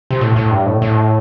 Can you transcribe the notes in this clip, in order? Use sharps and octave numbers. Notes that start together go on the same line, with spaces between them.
C3
A2
A2
G2
A2
A2